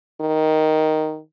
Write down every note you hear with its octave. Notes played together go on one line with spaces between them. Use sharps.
D#3